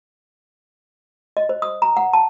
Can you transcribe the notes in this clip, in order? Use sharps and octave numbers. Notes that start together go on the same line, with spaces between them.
D#5
C5
D#6
A#5
F#5
A5